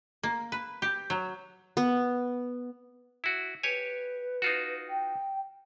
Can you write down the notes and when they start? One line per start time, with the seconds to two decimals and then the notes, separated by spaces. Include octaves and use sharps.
0.23 A#3
0.52 B4
0.82 G4
1.10 F#3
1.77 B3
3.24 E4 F#4
3.63 G4 B4 C#5 G#5
4.42 D#4 F4 F#4
4.89 G5